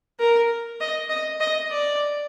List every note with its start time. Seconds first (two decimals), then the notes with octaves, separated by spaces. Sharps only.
0.19 A#4
0.81 D#5
1.10 D#5
1.40 D#5
1.70 D5